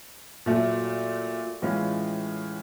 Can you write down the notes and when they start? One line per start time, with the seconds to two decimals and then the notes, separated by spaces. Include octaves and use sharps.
0.46 A#2 F#3 A3
1.62 A2 E3 G#3 C#4 F4